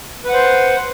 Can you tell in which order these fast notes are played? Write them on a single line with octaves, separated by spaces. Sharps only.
B4 F#5 C5